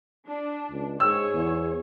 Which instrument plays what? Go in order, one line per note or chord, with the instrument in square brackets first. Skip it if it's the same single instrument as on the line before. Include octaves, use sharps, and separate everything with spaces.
[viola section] D4
[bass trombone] C#2
[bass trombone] G#2 [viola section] G#4 C#5 [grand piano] E6
[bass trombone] E2